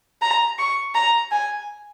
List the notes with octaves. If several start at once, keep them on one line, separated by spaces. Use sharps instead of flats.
A#5
C#6
A#5
G#5